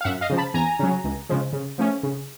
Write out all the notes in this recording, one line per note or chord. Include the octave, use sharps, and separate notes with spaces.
F5
F#2 E5 F#5
D#5 F5
C#3 F3
A5 B5
E2 G#5 A#5
C#3 F#3
C#2
C#3 F3 G#3
C#3
F3 A3 C#4
C#3